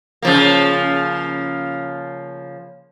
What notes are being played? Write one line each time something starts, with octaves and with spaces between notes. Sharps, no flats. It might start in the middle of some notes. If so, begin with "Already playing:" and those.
C#3 F3 A#3